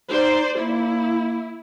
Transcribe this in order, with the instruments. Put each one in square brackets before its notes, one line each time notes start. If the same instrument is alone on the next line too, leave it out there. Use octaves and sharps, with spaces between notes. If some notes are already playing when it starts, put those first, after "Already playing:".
[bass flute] D#4 [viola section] C5 D5
[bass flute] A#3 [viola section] E4